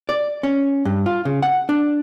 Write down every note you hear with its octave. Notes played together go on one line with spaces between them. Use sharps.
D5
C#4
G2
F4
C#3
F#5
D4